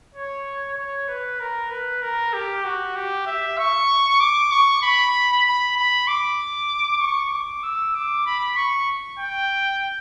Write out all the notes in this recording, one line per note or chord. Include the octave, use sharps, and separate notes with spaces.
C#5
C#5
B4
A#4
B4
A#4
G4
F#4
G4
E5
C#6
D6
C#6
B5
B5
B5
D6
C#6
D6
E6
D6
B5
C#6
G5